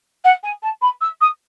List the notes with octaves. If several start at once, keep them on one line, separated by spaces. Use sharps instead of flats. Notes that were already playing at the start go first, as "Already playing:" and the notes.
F#5
G#5
A5
B5
E6
D#6